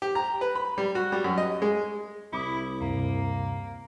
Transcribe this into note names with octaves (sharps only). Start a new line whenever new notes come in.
G4
A#5
B4
B5
G3
F#4
G3
F#2
D#5
G#3
C2 E4 B5 D6 D#6
D2 G2 C3 A#3